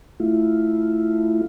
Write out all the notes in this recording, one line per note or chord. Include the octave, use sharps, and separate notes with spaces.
A3 E4 F4